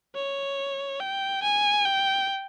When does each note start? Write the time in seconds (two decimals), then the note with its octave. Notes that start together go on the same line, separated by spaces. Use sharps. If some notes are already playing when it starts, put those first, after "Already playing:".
0.15 C#5
1.01 G5
1.43 G#5
1.85 G5